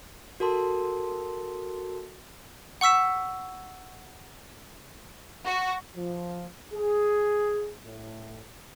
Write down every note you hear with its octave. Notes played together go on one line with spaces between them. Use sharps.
F#4 A4 A#4 A5 C6
F#5 C#6 E6 B6 E7
F#4
F3
G#4
A2